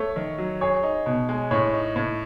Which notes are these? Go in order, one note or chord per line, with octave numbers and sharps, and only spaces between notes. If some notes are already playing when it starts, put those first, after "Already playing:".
Already playing: A3 C#5
D#3
F#3
G#4 C#5
D#4
B2
G#3
A2 C#5
D#4
A2